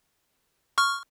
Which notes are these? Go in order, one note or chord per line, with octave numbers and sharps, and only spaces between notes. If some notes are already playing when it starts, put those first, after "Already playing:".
C#6 F6